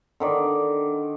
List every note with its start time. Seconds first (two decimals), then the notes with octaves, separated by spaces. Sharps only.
0.20 D3 D#3 D5